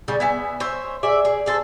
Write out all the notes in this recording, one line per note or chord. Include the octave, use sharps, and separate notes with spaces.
C#3 G3
B3 E5 G#5
C5 C#5 E5
G#4 D5 E5
G#4
G#4 A4 C5